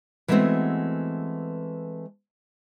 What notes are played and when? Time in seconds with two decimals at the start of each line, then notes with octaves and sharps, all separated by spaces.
0.28 E3 G#3 A3 B3 C4 F#4